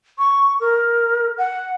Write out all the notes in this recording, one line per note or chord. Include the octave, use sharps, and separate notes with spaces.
C#6
A#4
F#5